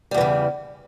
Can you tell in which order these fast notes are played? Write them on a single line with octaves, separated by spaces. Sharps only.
G3 E2 E3 C#3